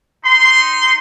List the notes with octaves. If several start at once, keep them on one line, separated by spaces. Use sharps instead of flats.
D#4 C6